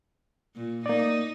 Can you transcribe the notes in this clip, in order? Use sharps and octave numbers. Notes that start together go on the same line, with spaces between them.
A#2
A#3 D#4 D5